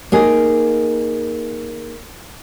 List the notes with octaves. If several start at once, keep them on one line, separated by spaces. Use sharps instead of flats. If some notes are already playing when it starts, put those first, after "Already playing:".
A#3 D#4 G#4